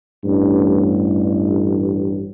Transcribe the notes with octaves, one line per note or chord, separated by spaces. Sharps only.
A1 G2